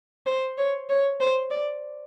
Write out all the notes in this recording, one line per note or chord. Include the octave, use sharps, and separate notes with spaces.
C5
C#5
C#5
C5
D5